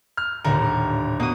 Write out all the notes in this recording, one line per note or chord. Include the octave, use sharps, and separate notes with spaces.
F6
D#1 D#2 A2 D3 A#4
B2 A#3 D#6